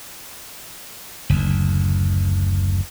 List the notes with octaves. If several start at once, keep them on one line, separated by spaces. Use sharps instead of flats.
F#1 D2